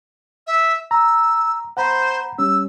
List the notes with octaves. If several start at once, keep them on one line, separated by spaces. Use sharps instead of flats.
E5
A#5 E6
C5 F#5 A#5 B5
G3 C#4 E6